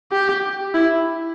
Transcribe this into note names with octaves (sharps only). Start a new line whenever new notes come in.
G4
E4